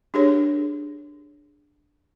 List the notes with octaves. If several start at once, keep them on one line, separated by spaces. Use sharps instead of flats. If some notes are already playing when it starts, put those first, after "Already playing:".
D4 G4 G#4 A#4 C#5